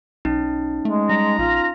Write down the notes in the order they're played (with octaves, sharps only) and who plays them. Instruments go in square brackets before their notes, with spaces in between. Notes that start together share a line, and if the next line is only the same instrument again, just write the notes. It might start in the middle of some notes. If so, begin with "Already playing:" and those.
[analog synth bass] B1 [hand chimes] C#4 D#4
[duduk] G#3 [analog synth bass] A3
[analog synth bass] G3 [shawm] A#5
[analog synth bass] A#1 [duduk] F4